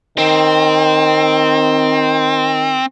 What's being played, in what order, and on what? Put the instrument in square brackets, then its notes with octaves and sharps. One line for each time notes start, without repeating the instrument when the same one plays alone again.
[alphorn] D#3 [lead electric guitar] C4